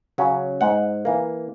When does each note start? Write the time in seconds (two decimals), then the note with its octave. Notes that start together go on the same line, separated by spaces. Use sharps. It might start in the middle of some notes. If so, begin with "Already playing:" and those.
0.18 C#3 F#3 C#4
0.61 G#2 F#5
1.05 E3 A#3